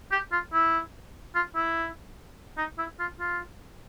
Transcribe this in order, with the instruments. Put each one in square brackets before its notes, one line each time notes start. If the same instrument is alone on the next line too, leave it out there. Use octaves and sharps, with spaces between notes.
[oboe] G4
F4
E4
F4
E4
D#4
E4
F4
F4